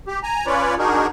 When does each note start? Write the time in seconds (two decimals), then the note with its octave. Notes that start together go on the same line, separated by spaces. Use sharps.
0.08 G4
0.23 G#5 A#5
0.47 C#4 F4 B4 C#5 D5
0.79 D4 D#4 F#4 G#4 A#4